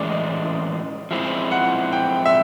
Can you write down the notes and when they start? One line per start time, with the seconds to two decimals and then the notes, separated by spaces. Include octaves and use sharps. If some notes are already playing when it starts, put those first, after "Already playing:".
Already playing: A2 E3 G#3 C#4 E4 D5
0.10 D#5
1.11 F3 G#3 C4 E4 E5
1.51 F#5
1.93 G5
2.25 E5